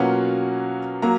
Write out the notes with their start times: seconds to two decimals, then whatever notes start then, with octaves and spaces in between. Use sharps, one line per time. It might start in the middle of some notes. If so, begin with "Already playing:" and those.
Already playing: B2 F#3 A#3 C#4 F4 F#5
1.02 F#3 A#3 A#5